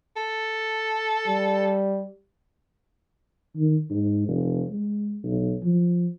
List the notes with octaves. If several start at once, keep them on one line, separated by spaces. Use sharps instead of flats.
A4
G3
D#3
G#2
F1
G#3
B1
F3